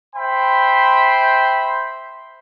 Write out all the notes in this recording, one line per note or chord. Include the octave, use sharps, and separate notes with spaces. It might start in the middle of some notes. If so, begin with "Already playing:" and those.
C5 E5 G5 B5 C6